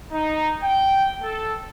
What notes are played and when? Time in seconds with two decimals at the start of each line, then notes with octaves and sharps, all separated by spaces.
0.12 D#4
0.62 G5
1.23 A4